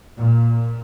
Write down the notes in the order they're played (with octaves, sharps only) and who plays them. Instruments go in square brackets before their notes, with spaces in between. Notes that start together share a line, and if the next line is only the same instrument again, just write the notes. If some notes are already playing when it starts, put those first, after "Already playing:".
[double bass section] A#2